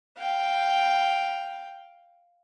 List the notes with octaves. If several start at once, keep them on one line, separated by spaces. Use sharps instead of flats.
F5 G5